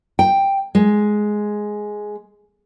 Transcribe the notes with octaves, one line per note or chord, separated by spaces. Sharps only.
G5
G#3